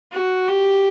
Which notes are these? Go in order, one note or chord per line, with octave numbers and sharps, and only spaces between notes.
F#4
G4